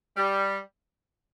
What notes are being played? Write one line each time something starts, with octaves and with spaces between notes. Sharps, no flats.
G3